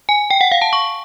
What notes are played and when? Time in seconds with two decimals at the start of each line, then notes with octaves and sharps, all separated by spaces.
0.09 G#5
0.30 G5
0.41 F#5
0.52 F5
0.62 A5
0.73 C#6